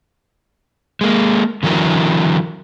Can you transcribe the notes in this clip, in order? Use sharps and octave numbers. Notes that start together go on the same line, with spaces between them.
G#3 A#3
D3 E3 F#3 A#4